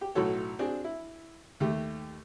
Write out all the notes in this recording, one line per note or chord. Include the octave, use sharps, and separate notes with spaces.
G4 G5
B1 A2 F#3 F#4 A4 C#5
C4 D4 F#4 G#4
E4
D#2 A3 G4